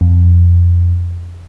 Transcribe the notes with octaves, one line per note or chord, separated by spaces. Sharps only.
F2